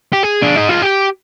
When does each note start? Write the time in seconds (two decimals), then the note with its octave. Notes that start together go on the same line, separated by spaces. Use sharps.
0.13 G4
0.23 G#4
0.43 D4
0.56 D#4
0.69 F4
0.82 G4